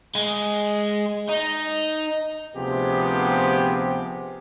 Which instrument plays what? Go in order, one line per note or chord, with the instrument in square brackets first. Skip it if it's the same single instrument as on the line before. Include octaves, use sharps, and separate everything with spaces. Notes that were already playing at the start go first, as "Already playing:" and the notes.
[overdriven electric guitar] G#3
D#4
[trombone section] D2 C3 F3 B3 G4 G#4